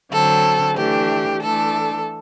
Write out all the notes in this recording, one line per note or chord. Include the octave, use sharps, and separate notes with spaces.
D3 F#3 C4 A4
E3 A3 D4 G4
E3 A3 D4 A4